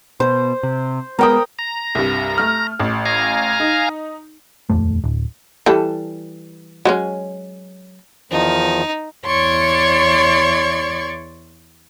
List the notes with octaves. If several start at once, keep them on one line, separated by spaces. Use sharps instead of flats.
B2 C5
C3
G#3 B3 A#4 G5 D#6
A#5
C2 G2
A3 F6
A1
F5 G#5 A#5
D#4
D#1 F2 A3
D1
E3 G3 A4
F#3 G#3 C#4
E2 D#3 F3 D#4
E2 C#5 D5 C6 C#6 G#6